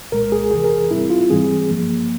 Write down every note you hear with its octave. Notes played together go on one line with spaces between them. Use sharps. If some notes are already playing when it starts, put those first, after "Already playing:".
C2 A#2 G#3 A#4
G#4
E2 C3 E3 G#4
A#4
G#2 G3 C4 E4
F4
G#2 E3 G3 C4 G#4
G2 F3 A#3